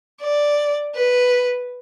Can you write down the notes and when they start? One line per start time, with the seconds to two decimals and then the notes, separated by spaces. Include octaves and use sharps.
0.22 D5
0.95 B4